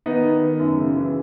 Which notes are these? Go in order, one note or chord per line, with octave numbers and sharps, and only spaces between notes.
D#3 B3 D#4
D#3
D#3
F#2
C#3
E3